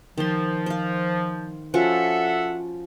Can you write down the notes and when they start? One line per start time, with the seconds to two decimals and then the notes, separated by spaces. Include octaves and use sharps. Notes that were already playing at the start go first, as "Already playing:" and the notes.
0.18 D#3 F3 C6
0.66 C5 F5
1.74 F3 C#4 F#4 A4 E5 F#5